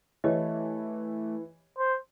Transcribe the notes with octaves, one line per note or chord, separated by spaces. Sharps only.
E3 A3 G4 C#5 D#5
C5